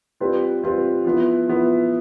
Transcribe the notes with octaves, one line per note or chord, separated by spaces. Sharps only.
G3 C4 F4 B4
G3 C4 F4 B4
F3 B3 E4
F3 B3 E4